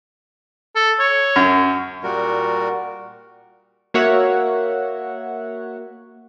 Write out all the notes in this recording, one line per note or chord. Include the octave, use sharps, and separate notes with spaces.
A4
C#5
F#2
A#2 G3 F#4 A#4
A#3 F#4 C#5 E5 F#5